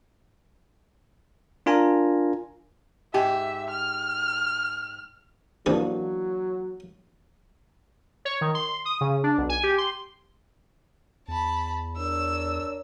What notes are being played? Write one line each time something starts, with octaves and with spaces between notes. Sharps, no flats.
D4 F4 A#4 G#5 A#5
G#2 G4 E5 G#5
F6
C3 E3 F#3 A#3 D4 G#4 B4
C#5
D#3
C6
D#6
C#3
D4
B1
G#5
G4
C6
E2 A5 B5
D4 A#4 C#5 E6